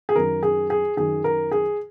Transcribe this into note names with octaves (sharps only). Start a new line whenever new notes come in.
G#4
F#2 D#3 A#4
G#4
G#4
F#2 D#3 G#4
A#4
G#4